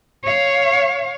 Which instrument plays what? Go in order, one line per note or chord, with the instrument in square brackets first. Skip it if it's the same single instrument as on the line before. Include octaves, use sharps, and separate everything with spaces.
[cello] C#5 F5